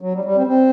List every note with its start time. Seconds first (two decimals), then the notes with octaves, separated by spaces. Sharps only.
0.01 F#3
0.13 G3
0.25 G3
0.36 C4
0.47 C4